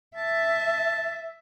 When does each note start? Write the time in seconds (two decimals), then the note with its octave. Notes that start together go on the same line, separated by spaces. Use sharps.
0.17 E5 A5